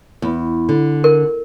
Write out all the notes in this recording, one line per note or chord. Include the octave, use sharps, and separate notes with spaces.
E2
D3
A#4